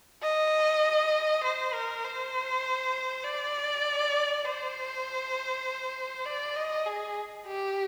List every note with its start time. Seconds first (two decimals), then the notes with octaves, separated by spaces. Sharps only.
0.22 D#5
1.43 C5
1.73 A#4
2.04 C5
3.24 D5
4.44 C5
6.25 D5
6.56 D#5
6.86 G#4
7.46 G4